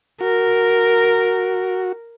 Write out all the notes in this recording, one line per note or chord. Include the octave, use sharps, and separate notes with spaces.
F#4 A#4